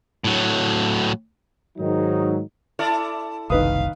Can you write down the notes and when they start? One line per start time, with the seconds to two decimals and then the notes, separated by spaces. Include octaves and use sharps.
0.24 A2 F#3
1.78 G#2 D#3 F#3 D#4
2.79 E4 A4 D5
3.50 F#1 C2 D#3 B4 F5 D#6